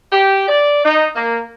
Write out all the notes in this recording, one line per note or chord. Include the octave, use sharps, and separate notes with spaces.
G4
D5
D#4
A#3